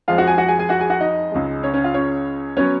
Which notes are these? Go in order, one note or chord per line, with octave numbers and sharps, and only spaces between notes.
F2 F3 G#3 F4 F5
F#4 F#5
G#4 G#5
F#4 F#5
G#4 G#5
G#4 G#5
F#4 F#5
G#4 G#5
F#4 F#5
D#4 D#5
C#2 C#3 G#3
C#4 C#5
C#4 C#5
F4 F5
C#4 C#5
F#3 B3 C#4 C#5